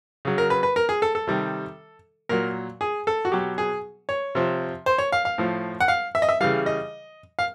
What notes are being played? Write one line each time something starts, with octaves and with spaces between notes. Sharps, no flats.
C#3 F#3
A#4
B4
B4
A#4
G#4
A4
A4
C3 D#3 G3
A#2 F#3 A#4
G#4
A4
F#4
B2 F#3 G4
G#4
C#5
C3 F3
C5
C#5
F5
F5
A2 F3
F#5
F5
E5
D#5
E5
C#3 E3 G3 F5
D#5
F5